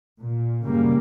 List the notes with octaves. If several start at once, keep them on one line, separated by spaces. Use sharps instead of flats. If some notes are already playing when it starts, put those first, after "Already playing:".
A#2
F#2 C#3 G3 A#3